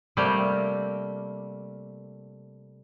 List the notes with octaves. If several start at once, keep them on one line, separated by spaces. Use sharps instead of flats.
C3 G3 A3 A#3 C4